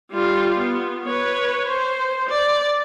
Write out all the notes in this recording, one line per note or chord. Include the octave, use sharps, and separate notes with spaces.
G3 F4
B3
B4 C#5
C5
D5